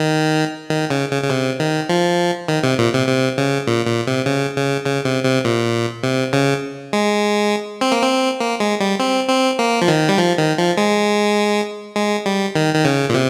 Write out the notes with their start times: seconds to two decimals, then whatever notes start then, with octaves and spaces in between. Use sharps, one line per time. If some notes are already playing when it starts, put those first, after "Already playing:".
Already playing: D#3
0.71 D#3
0.90 C#3
1.11 C#3
1.23 C#3
1.30 C3
1.60 D#3
1.89 F3
2.48 D#3
2.64 C3
2.78 A#2
2.93 C3
3.08 C3
3.38 C#3
3.67 A#2
3.87 A#2
4.07 C3
4.26 C#3
4.56 C#3
4.85 C#3
5.05 C3
5.25 C3
5.45 A#2
6.03 C3
6.33 C#3
6.93 G#3
7.81 C4
7.92 A#3
8.02 C4
8.40 A#3
8.60 G#3
8.80 G3
9.00 C4
9.29 C4
9.59 A#3
9.81 F3
9.88 D#3
10.09 G3
10.18 F3
10.38 D#3
10.58 F3
10.77 G#3
11.96 G#3
12.26 G3
12.55 D#3
12.74 D#3
12.85 C#3
13.09 A#2
13.14 C3